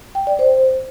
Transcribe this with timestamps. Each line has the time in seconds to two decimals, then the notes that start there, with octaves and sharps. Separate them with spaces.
0.15 G5
0.27 D5
0.39 C5